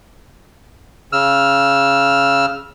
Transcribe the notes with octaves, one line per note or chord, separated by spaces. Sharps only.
C#3 E6 F6